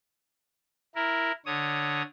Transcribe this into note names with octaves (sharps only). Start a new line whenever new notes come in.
E4 A#4
D3 C#5 D#6